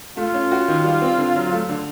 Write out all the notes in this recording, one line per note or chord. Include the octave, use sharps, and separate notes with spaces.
A3 F4
C#4
F#4
D#3
G3
C4
D3
F#3
A3
D3